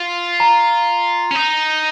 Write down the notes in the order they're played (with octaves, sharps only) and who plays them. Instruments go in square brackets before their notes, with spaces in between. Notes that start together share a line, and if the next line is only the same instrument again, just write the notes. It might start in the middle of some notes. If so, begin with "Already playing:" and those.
Already playing: [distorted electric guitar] F4
[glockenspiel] A#5
[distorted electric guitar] C#4
D#4